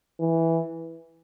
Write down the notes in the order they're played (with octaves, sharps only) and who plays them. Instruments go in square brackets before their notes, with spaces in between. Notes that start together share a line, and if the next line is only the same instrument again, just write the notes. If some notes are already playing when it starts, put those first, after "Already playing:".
[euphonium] E3